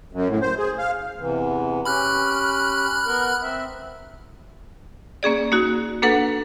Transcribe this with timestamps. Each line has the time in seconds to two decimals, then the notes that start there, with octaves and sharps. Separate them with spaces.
0.13 F#2
0.28 A2
0.41 C5
0.58 G#4
0.79 F5
1.18 E2 C3 E3
1.85 C#4 G4 B5 F6 F#6
3.06 B3 A#4
3.42 C4 E5
5.23 A#3 C#4 G#4 D5
5.52 A#3 D#4 F#4
6.02 A#3 D4 A4 B4 F#5